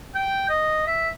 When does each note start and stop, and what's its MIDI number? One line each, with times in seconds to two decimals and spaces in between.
0.15 0.48 79
0.49 0.82 75
0.87 1.09 76